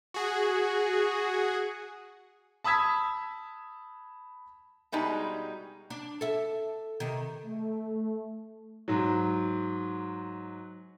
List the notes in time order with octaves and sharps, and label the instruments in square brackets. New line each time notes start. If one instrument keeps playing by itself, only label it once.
[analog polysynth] F#4 G#4
[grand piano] A5 B5 D#6 E6 G#6 B6
[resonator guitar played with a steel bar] B2 G3 G#3 D#4
[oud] D4
A4 E5
C3 D#3
[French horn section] A3
[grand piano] G#2 F#3